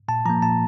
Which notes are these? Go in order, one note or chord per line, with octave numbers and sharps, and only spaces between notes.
A#2 A5
F3 A#3 A#5
A#2 A5